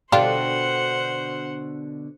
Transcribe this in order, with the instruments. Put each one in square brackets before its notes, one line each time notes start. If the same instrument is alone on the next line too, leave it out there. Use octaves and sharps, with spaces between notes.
[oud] B2 D3 [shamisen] D4 F4 G4 [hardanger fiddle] C5 F#5